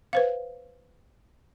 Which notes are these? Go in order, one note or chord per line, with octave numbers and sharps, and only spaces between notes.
B4 C5 F5